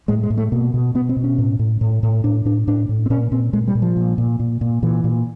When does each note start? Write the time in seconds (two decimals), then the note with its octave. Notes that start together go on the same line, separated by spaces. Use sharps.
0.08 A2 G#3
0.23 G#3
0.30 A2
0.37 A3
0.52 B2 A#3
0.74 B2
0.95 B2 B3
1.09 C4
1.17 B2
1.24 C#4
1.38 A2
1.59 A2
1.81 A2
2.03 A2
2.24 A2 D4
2.45 A2 D4
2.67 A2 D4
2.89 A2
3.06 C4
3.10 A#2 C#4
3.32 A#2 C4
3.53 A#2 G#3
3.68 G3
3.75 A#2
3.82 F3
3.97 A#2
4.18 A#2
4.40 A#2
4.61 A#2
4.82 A#2 E3
5.04 A#2